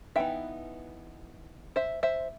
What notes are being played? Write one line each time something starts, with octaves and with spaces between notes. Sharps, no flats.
E3 B3 D#4 E5 G5
C5 E5
C5 E5